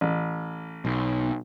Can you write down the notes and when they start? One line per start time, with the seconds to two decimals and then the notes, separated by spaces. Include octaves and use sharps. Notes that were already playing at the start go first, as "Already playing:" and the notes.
0.01 A1
0.85 B1